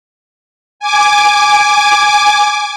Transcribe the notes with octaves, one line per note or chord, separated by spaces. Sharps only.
G#5 D6